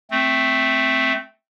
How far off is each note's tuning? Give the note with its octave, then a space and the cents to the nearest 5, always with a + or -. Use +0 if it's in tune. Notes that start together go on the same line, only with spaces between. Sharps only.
A3 +0 C4 +0